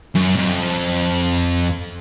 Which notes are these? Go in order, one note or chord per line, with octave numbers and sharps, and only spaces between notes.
F#2
F2